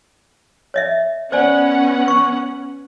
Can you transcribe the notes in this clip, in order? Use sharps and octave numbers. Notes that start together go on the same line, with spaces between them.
C#5 D#5 E5
B3 C#4 C5 D5 F#5 G#5
C#6